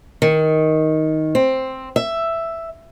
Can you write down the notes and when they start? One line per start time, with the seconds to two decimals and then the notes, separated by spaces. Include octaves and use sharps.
0.22 D#3
1.35 C4
1.96 E5